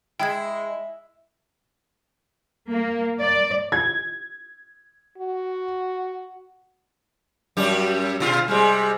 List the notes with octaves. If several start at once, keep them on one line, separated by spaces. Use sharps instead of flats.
G#3 E4 G5 G#6
A#3
D5
G#6
F#4
F#2 G3 G4
B2 F4
C3 G3 G#3